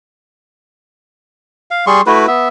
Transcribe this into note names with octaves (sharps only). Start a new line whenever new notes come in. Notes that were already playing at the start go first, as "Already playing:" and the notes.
F5
G3 G#4 C6 C#6
A3 E4 F#4 B4
B3 E5